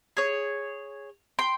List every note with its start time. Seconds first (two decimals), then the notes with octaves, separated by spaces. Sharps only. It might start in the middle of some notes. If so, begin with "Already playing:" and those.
0.17 G#4 C#5
1.39 G5 C6